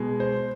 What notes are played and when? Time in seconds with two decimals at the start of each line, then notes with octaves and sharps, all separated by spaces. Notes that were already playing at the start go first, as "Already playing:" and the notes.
Already playing: B2 G#3
0.20 C5